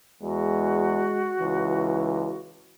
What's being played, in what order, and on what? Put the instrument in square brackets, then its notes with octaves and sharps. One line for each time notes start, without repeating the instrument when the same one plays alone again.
[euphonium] E2 [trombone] G#3 [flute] F#4
[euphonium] C#2 [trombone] E3